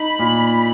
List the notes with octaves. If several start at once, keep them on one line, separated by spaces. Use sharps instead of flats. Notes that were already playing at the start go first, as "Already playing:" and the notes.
Already playing: D#4 B5
A#2